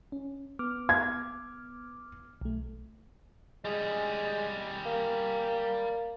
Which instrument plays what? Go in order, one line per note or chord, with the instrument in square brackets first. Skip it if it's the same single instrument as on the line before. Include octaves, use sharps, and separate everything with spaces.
[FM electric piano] C#4
B3 D6 F6
[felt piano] G#6
[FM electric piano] B1 A3
[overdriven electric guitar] G3 G#4 [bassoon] G#3
[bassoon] A#3